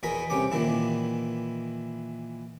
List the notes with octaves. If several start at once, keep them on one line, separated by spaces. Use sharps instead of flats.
E2 B2 G#4 A#4 B5
C2 C3 C#4 D6
A#2 D#3 E3 E4